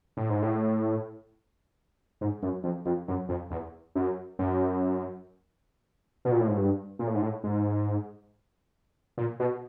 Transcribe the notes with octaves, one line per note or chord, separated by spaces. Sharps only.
A2
G#2
A2
G#2
F#2
F2
F2
F#2
F2
E2
F#2
F#2
B2
A#2
A2
G#2
G2
A#2
A2
G#2
A2
G#2
A#2
B2